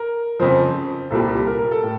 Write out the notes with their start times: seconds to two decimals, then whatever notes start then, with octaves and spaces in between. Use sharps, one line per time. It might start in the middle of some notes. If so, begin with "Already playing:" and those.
Already playing: A#4
0.40 F2 C#3 F3 C5
1.11 C2 A#2 G3 A4
1.47 A#4
1.58 A#4
1.71 A4
1.83 A2